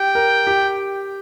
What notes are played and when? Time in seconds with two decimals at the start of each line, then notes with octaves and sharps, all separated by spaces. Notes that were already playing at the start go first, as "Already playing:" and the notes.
Already playing: G4 G5
0.15 A#4
0.47 G4